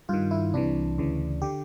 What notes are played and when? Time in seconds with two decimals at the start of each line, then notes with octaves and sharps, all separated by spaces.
0.09 G2 D#3 F4
0.31 E4
0.54 C2 C3 E3 D4
0.98 D2 C#3 E3
1.42 D3 G4